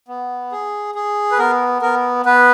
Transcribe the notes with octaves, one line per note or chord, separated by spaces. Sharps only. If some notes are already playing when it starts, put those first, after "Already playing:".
B3
G#4
G#4
B4
B3 A#4
B3 A#4
B3 B4